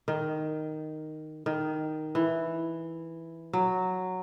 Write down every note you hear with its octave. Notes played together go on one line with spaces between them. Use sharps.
D#3
D#3
E3
F#3